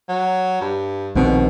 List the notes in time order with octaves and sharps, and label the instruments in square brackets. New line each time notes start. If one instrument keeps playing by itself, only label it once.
[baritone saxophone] F#3
G2
[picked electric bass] A#1 D#3 C4 [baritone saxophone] B2